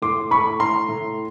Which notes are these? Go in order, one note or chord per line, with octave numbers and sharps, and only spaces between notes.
A2 C6 D6
A2 B5 C#6
A2 A#5 C6
A2